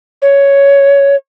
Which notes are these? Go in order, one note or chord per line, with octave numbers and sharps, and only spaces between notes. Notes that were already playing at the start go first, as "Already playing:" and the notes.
C#5